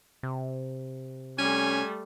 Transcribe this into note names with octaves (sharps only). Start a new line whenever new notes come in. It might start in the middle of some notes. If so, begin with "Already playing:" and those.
C3
G3 A3 C#4 G#5